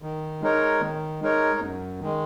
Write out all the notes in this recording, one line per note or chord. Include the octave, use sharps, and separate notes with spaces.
D#3
G#3 D#4 A#4 C#5
D#3
G#3 D#4 A#4 C#5
F#2
D#3 G#3